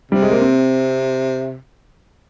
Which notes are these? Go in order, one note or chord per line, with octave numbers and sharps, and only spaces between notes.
C3 G3
G#3
A#3
C4